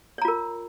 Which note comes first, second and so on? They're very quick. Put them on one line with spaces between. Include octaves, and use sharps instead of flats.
C#5 A#5 F4 A#4